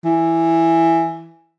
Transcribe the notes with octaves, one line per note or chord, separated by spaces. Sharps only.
E3